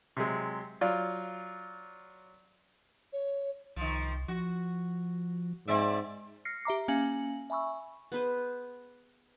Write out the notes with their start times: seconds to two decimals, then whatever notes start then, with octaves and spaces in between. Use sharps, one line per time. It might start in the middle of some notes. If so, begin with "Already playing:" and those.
0.17 C3 F#3 G#3
0.81 F#3 F4 D5
3.13 C#5
3.76 C2 D#3 F3
4.28 F3 F#4
5.68 G#2 C4 D5 E5
6.45 F6 A#6 C7 C#7
6.65 G4 E5 A#5 D6
6.88 A#3 C#4 F5 G#5 F#7
7.50 E5 G#5 B5 C#6 E6
8.12 B3 G#4 B4 C5